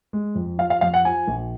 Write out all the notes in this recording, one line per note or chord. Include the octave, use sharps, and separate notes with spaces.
G#3
F2
F3 F5
F5
F2 F5
F#5
F3 G#5
A#1